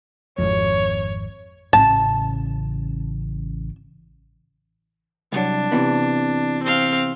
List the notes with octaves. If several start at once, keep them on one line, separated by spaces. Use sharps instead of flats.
G#1 F2 C#5
A1 C#3 A5
C2 F#3 D4
C3 E3 B3
C4 F5